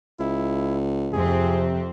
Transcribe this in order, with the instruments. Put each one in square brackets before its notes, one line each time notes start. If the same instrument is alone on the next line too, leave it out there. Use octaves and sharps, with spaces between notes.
[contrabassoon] C#2 [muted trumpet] E4
[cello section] F2 C4 [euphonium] C3 [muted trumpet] G#4